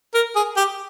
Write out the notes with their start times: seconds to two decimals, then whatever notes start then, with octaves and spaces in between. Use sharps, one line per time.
0.14 A#4
0.35 G#4
0.56 G4